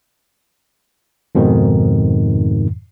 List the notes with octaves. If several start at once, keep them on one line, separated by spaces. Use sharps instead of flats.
F2 G#2 B2 D#3